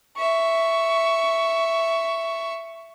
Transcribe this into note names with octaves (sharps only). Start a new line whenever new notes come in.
E5 C#6